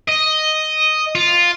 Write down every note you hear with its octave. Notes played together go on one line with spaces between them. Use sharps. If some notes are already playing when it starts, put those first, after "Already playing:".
D#5
F4